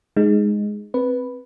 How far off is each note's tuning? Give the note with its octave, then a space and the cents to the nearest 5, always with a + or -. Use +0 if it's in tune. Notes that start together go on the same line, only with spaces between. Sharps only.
G#3 +0 D#4 -10
C4 +0 B4 +0